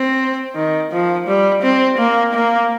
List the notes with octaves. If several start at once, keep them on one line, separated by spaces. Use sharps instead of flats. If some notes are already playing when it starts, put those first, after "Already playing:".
Already playing: C4
D#3
F3
G3
C4
A#3
A#3